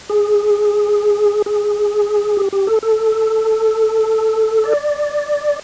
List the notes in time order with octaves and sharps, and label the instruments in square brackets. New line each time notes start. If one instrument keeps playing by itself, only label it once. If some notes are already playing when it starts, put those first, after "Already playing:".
[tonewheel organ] G#4
G#4
G4
G4
A4
A4
D5